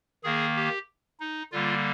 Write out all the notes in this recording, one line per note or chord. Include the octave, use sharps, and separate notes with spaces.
D#3 A#3 G#4
G4
D#4
D3 G3 A#3 F4